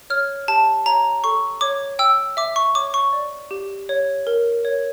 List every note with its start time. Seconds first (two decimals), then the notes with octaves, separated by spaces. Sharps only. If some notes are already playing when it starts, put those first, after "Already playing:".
0.10 C#5 F6
0.48 G4 A5
0.86 C#5 A#5
1.24 A4 C#6
1.61 C#5 D6
1.99 G5 E6
2.37 E5 D6
2.56 C#6
2.75 C#5 D6
2.94 C#6
3.13 D5
3.51 G4
3.89 C#5
4.27 A#4
4.65 C#5